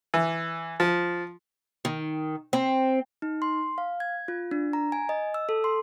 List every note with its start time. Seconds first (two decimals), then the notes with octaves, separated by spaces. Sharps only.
0.14 E3
0.80 F3
1.85 D#3
2.53 C4
3.22 D#4
3.42 C6
3.78 F5
4.00 G#6
4.28 F4
4.51 D4
4.73 A#5
4.92 G#5
5.09 D#5
5.34 E6
5.49 A4
5.64 C6